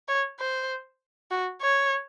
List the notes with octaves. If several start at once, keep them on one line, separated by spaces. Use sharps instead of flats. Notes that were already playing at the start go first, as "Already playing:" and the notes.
C#5
C5
F#4
C#5